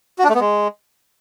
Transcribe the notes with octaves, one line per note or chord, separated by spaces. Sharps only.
F#4
D4
A3
B3
G#3